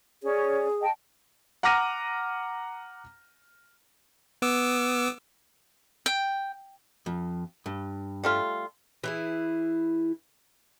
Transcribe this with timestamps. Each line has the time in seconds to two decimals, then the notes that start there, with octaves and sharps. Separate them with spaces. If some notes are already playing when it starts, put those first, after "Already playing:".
0.23 C#4 G#4 C#5 D5
0.81 D#5 G5 A5
1.63 F#5 A#5 D6 F6 A#6 D#7
4.42 B3 D6 E6
6.06 G5
7.06 F2
7.66 G2
8.24 G3 A3 F4
9.04 E3 E4 G#4